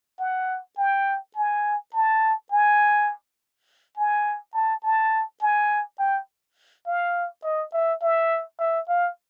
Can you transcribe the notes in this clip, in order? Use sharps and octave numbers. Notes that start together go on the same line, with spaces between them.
F#5
G5
G#5
A5
G#5
G#5
A5
A5
G#5
G5
F5
D#5
E5
E5
E5
F5